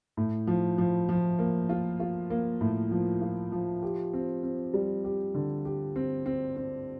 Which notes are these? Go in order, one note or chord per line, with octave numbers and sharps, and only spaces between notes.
A2
F3
F3
F3
A#3
F4
F4
A#3
A2
F3
F4
F3
G4
C4
C4
G3
G4
D3
G4
C4
C4
C4